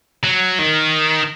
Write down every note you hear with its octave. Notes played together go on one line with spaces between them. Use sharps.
F#3
D#3